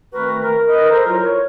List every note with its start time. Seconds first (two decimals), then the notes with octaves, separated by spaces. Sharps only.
0.14 D#3 A3 C4 F#4 A#4 B4
0.43 A#4
0.69 A#4 B4 D#5
0.90 A4 C5 A#5
1.05 F#3 E4 F4 A#4
1.24 C#5